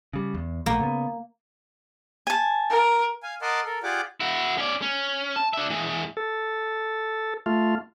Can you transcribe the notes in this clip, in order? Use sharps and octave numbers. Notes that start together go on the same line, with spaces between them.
C#3 G3
E2
A#1 A3 A#3
C#3 B3
G#5 A5
A#4
F5 G#5
A#4 D#5 F#5 A5 C6 D6
A4 A#4
F4 G4 G#4 D5 F#5 D6
E4 F#4
C#4 D5
C#4
A5
D4 E5
E3 G#3
A4
A3 F4